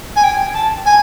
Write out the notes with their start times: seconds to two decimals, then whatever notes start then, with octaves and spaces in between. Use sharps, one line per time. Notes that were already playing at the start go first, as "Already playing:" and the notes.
0.16 G#5
0.24 G5
0.55 A5
0.86 G#5